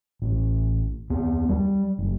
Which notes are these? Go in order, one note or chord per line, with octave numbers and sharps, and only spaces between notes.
A1
D#2 B3
G3
F#1